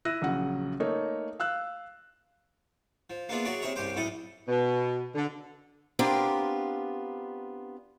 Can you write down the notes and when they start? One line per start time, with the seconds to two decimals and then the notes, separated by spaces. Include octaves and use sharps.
0.05 E4 E6 F#6 A#6 D#7
0.22 A#1 C#3 F#3 F#5
0.80 A3 A#3 D#4 C#5
1.40 F5 E6 F#6
3.10 F3
3.29 A#3 B3 D4 E4 F4 G#4
3.45 F#3 F#4 G#4 C#5 D5 E5
3.62 C3 E4 G#4 C#5 E5 A#5
3.76 C2 G2 C#4 G4 C5 G5
3.96 B1 A2 A3 E4 A4 D#6
4.47 B2
5.15 D3
5.99 B3 C4 D4 F4 G4 A#4